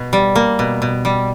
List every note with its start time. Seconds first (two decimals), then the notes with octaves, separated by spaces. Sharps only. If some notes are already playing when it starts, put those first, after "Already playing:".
Already playing: B2
0.13 G3
0.36 A#3
0.59 B2
0.82 B2
1.05 G3